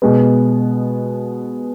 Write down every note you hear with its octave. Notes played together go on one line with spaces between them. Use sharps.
B2 G#3 B3